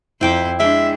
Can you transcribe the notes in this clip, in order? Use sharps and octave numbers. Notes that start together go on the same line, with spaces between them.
F2 E4 C5 G5 D6
G#3 D4 E5 G5